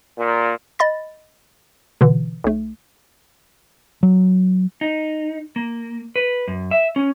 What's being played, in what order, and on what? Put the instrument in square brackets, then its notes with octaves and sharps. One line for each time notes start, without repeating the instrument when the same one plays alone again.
[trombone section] A#2
[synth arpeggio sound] D#5 B5 A6
B2 D3 E3
B1 A3
[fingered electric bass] F#3
[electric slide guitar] D#4
A#3
B4
F#2
E5
C#4